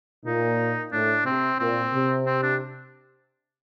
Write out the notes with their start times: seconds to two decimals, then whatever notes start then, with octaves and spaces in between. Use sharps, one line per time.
0.25 A#2 D#4
0.92 A2 D4
1.25 C3 C4
1.59 A#2 C4
1.92 C3
2.26 C4
2.43 D4